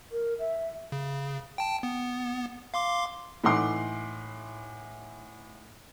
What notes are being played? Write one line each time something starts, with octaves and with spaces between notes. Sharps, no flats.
A#4
E5
C#3
G5 A5
B3
F5 C6 D6
A2 E3 D#4 F#5 C6 D6